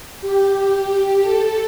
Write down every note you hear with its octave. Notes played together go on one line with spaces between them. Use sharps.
G4
A4